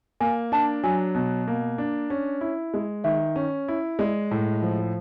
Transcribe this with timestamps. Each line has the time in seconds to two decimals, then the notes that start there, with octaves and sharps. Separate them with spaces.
0.20 A#3 G#5
0.52 D4 A5
0.84 F#3 G#5
1.15 B2
1.47 A#3
1.78 D4
2.10 C#4
2.41 E4
2.74 G#3
3.04 D#3 E5
3.36 C#4
3.68 E4
3.99 G#3 D5
4.31 A2
4.62 F3